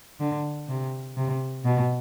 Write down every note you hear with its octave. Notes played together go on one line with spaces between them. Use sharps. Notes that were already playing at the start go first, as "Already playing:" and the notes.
D3
C3
C3
B2